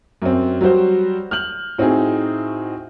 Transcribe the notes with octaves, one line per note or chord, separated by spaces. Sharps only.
F#2 C4
F#3 G3 F#4 C5
F6 G6 F#7
A2 C4 D#4 F#4 G#4